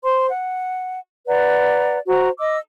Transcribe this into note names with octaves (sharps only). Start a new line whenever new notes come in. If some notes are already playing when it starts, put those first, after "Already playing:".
C5 C6
F#5
B4 D5 F#5 A#5
F#4 C5 A#5
D#5 D6 E6